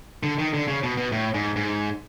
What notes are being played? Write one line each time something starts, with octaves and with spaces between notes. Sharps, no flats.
D3
D#3
D3
C#3
B2
B2
A2
G#2
G#2